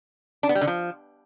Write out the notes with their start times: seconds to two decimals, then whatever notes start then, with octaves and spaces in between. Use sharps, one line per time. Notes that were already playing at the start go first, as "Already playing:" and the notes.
0.43 D4
0.49 B3
0.55 G3
0.61 D3
0.67 F3